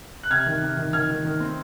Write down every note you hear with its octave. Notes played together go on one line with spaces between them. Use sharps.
F#6
C3 F6 G#6
D#3
C3
D#3
D#3 F6 G#6
D#3
D#3
C4